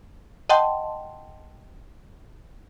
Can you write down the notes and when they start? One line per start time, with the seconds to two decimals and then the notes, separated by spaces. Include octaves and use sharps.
0.49 D#5 F#5 G5 A5 C6